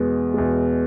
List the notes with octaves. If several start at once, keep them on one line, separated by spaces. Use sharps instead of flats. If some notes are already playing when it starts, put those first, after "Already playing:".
Already playing: E2 B2 G#3
E2 B2 G#3